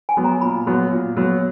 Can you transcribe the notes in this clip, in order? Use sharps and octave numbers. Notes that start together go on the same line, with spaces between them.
G#5
F#3 B3
A#5
A#2 B5
F#3 B3
A#2
F#3 B3